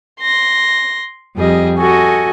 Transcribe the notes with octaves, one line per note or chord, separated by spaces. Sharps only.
C6 A#6
F2 G3 G#4 D#5
F#4 A4 D#5 G#5 C#6